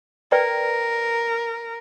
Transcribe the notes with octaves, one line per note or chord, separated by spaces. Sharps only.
A#4 B4 D5 G5